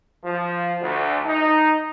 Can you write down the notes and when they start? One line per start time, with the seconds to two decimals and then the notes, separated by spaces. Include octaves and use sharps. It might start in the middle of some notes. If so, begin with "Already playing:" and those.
0.24 F3
0.81 D2
1.26 D#4